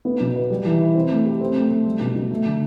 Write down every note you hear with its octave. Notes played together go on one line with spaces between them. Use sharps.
B3
B2
B4
G3
E3
E4
C4
A3
G4
C4
A3
A3
G3
B2
B2
A3
D3